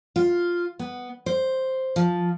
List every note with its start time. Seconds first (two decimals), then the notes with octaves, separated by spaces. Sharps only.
0.16 F4
0.79 B3
1.26 C5
1.96 F3